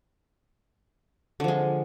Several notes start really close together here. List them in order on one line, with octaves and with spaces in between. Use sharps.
D3 F3 G#3